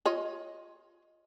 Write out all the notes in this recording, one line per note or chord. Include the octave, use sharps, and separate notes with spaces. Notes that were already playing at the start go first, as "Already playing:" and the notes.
F4 C#5 D#5